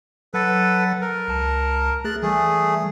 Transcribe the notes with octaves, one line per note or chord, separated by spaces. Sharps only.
F#3 A4 B4 F#5 A6
A#4
C#2 A5
A3 G#4 F#6 A6
E3 G3 A3 G#4